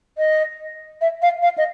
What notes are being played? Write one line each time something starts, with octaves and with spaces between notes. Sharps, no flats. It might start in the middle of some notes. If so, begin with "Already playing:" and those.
D#5
E5
F5
F5
D#5